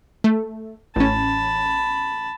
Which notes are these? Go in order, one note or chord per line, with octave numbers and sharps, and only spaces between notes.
A3
A1 C#4 A5 B5